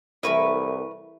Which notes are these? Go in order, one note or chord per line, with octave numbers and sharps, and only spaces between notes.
C2 E3 A3 E4 A#4 B4 C#6